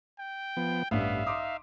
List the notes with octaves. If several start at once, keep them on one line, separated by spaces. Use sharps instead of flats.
G5
F3 B3
A1 G2 B3 E5 F5
D#4 C6 D6 D#6